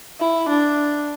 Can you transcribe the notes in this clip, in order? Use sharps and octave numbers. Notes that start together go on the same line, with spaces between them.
E4
D4